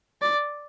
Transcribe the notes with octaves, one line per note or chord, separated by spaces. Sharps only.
D5